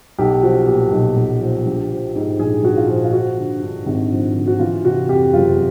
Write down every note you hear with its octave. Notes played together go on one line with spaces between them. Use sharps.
B1 G4
F3 F#4
A#2 G4
B1
B1
F3
A#1
F3
G#2
A#1 G#4
A#1 F#4
F4
F3
F4
F3 F#4
D3
G2
G#1
F3
D3
F#4
E3 F4
C3 F#4
F2 G4
F#1 F4